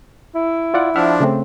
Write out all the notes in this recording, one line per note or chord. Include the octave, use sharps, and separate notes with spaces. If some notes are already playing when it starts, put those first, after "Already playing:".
E4
F4 D5 F#5
F3 D4 E5 F#5 F6
C#3 A3 C4